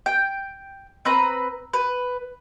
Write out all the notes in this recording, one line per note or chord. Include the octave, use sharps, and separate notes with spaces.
G5
C4 B4 A#5
B4